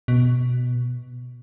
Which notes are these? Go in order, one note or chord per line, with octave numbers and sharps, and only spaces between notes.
B2